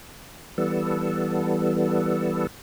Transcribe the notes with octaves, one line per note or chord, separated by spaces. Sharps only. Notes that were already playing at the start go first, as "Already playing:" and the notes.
E3 G3 B3 A4